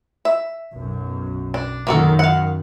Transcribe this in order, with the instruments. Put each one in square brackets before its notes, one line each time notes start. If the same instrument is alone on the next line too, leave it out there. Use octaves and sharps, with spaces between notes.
[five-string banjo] E5
[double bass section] B1 F#2
[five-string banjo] D4
[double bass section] F#2 D#3 [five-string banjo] A#3 F#4 A4
[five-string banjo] F5 F#5